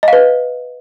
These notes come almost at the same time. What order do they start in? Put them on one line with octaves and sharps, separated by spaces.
D#5 F5 B4